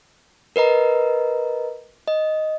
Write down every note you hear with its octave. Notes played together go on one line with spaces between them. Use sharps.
A#4 B4 D#5 A#5
D#5